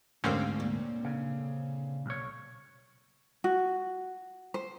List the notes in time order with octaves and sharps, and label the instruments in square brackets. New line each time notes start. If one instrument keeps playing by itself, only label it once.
[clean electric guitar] D2 G#2 [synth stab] D3 C4 C#4 [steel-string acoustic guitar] G4 A#4 F5
[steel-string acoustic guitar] A#2
[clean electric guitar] C#3
B1 C#5
[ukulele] F#4
C5